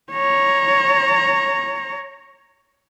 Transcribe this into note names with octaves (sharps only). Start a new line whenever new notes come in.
C#5 A#5